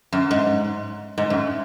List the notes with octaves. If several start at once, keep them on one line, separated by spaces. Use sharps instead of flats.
F#2
G#2
G#2
F#2